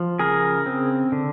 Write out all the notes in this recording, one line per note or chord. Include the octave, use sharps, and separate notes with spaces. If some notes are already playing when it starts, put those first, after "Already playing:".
Already playing: F3
C#3 G#4 A#4
C4
D3